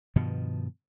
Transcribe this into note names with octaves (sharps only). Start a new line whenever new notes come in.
G2 B2 D#3 F3